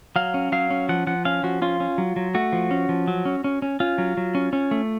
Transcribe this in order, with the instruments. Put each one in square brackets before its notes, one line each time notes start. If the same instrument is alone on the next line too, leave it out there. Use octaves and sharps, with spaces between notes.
[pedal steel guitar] F#3 F5
C#4
F#3 F5
C#4
F3 F#5
F3 F#5
C#4 F5
F3 F#4
C#4 F4
C#4
F#3
F#3
A3 F#4
F3
C#4
F3
F#3
C#4
C#4
C#4
C#4 F4
F#3
F#3
C#4
C#4
A3